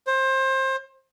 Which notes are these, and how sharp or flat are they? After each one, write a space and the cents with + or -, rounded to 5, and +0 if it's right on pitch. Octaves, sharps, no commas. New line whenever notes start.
C5 +25